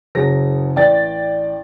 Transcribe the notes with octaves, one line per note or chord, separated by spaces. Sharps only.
F#1 F#3 G#4 A#6
A1 D5 G5 A6